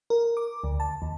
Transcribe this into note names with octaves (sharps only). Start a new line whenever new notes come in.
A#4
D6
D2
A5
D#2